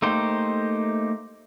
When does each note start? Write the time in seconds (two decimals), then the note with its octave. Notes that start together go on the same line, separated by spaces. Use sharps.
0.02 A3 A#3 D#4 G4 C5